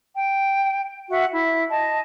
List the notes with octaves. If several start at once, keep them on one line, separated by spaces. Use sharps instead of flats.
G5
F#4 E5 F#5
E4
D#5 A5